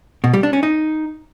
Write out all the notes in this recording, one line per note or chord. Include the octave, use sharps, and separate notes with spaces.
B2
G3
D4
C#4
D#4